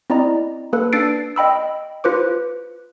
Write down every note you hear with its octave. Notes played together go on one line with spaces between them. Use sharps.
C4 E4 D5 D#5 A#5
A#3 A4 B4
D4 E6 A6 C7 D7
D#5 G5 B5 E6
F4 B4 C5 D6